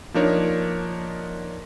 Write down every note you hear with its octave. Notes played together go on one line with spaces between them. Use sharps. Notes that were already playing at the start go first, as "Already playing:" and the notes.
F3 A#3 D4 D#4 A#4 C#5